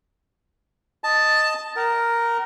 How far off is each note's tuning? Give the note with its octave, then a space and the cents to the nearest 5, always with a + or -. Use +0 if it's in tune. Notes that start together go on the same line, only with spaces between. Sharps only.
D#5 +0 A5 +5
A#4 +0 F#5 +45